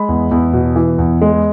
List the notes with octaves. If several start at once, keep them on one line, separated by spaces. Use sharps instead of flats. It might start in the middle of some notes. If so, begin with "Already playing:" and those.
Already playing: G#3 B5
E2
E2
B2
E3
E2
G#3